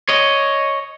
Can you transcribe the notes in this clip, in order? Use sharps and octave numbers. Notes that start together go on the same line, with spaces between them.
C#5 D#5